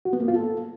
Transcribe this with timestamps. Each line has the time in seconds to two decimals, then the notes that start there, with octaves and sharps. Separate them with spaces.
0.05 F#4
0.13 B3
0.21 A#3
0.28 F4
0.36 A4